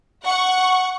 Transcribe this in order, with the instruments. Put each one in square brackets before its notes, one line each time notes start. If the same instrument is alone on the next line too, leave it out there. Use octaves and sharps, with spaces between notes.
[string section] F#5 C#6